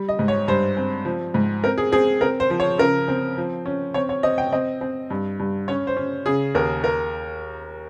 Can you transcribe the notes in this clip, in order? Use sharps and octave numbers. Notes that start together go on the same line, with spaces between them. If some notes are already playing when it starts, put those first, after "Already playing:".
Already playing: G3
D#5
G#2
C#5
G2 C5
C4
F3
G#2
C4 A#4
G#4
C4 G#4
C4 A#4
C5
F3
C#5
C#3 A#4
C4
F3
C#4
C4 C#5
C#5
C4 D#5
G5
C4 D#5
C4
G2
G2
C#4 C#5
C5
C#4
C#3 G#4
D#2 A#4
A#4